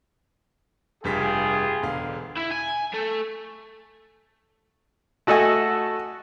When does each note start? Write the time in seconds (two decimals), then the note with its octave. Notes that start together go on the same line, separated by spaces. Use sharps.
1.04 F1 G2 F4 G4 G#4 B6
1.83 E1 D3 F5
2.37 E4
2.51 G#5
2.94 A3
5.27 A3 F#4 A4 D#5 G#5